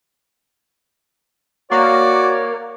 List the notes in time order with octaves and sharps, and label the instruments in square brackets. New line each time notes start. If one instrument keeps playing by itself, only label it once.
[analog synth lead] A#3 [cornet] F#4 [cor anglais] C#5 [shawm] D5